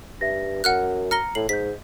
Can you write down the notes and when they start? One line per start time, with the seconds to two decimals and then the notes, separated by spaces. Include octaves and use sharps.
0.21 G2 E5 A#6
0.64 F#2 F#5 F6 F#6
1.11 A#5 F6 A#6 C#7 G7
1.35 A2 C7 F#7
1.49 G#2 D#5 G6 B6